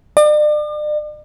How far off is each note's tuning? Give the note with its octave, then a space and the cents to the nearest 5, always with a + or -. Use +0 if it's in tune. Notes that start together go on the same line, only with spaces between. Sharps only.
D5 +40